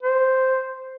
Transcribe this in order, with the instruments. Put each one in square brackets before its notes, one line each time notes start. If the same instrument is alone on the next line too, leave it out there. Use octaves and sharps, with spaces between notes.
[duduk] C5